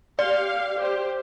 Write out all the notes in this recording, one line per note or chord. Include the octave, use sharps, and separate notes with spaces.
G4 D5 F5
G4 C5